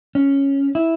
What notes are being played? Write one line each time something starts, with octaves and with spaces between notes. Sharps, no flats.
C#4
E4